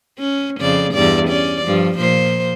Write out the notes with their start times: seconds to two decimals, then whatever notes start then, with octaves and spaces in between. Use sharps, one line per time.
0.19 C#4
0.59 F2 C#3 D5
0.94 E2 G2 D5
1.28 C#4 D5
1.65 G2 F3
1.98 A#2 F3 C5